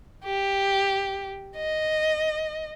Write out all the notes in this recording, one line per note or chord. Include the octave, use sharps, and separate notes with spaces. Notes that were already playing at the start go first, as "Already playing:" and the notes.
G4
D#5